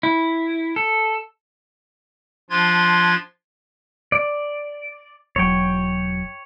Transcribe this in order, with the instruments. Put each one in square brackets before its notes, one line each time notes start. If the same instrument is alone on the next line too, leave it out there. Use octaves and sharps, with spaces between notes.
[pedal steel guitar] E4
A4
[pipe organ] F3 D4 F4 C6 G#6
[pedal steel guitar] D5
[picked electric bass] E1 F#3 [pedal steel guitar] C#5 G5